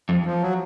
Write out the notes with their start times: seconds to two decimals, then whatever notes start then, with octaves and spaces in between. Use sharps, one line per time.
0.09 F2
0.26 F3
0.42 F#3